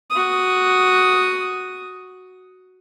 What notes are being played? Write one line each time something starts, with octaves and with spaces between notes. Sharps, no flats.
F#4 D#6